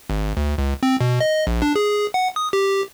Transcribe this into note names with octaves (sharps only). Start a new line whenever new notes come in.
G#1
D2
C#2
C4
B2
D#5
A#1
D4
G#4
F#5
D#6
G4